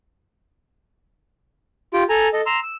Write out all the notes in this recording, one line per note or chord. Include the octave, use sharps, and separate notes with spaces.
F4 G4 G5
A4 G#5 A#5
A4 D#5
A#5 C6 E6
E6